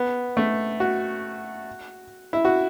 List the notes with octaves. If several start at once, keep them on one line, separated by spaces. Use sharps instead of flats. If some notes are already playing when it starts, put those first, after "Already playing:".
Already playing: B3
A3
F#4
E4
F#4